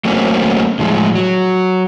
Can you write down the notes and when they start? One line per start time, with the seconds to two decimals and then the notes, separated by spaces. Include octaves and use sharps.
0.05 F#3 A3 A#3 C4 C#4
0.79 A2 F3 G#3
1.15 F#3